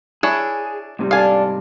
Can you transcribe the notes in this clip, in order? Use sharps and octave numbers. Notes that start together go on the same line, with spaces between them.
D4 E4 G#4 C#5
G#2 C3 G3
D4 A4 F5 G#5